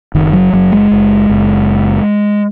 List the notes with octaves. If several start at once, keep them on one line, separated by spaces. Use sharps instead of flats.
F#1 D#3
F#3
F#1 F#3
G#3
F#1
F#1